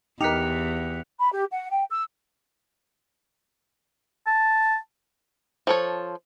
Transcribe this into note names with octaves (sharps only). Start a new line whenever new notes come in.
E2 D#4 G4 A#4 F#6 B6 C#7 F7
B5
G4
F#5
G5
E6
A5
F3 A4 C#5